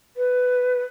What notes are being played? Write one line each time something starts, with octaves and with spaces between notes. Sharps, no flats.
B4